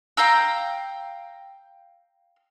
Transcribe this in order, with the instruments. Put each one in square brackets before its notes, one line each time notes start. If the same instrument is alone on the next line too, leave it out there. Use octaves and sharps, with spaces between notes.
[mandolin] F5 G5 A#5 E6